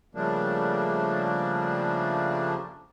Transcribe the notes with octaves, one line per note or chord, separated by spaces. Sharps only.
C#3 F3 G3 A3 A#3 D4